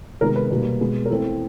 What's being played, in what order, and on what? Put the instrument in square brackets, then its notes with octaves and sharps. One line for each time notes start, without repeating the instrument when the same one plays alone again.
[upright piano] C3 D#3 G#3 B3 A#4
B4
B2 G3 A#3
B2 G#3 B3
A#4
E3 A3 C4 A4